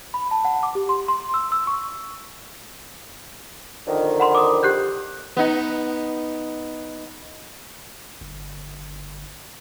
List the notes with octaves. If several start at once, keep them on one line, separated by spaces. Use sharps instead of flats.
B5
A5
F#5
D6
G4
C6
C6
E6
E6
C#6
F2 D3 D#3
F#5 B5 C6
D6 D#6
G4 F#6 G6
B3 D#4
G1